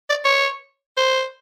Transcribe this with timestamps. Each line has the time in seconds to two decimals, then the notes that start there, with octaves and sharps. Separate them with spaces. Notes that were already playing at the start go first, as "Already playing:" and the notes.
0.10 D5
0.25 C#5
0.97 C5